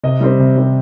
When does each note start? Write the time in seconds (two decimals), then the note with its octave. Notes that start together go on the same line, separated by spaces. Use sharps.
0.03 C3 D#5
0.21 G3 C4
0.39 C3
0.57 G3 C4